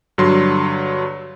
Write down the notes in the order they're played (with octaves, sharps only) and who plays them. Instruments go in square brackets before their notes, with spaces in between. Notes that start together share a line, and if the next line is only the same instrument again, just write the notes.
[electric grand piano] G2 D3 F#3 C6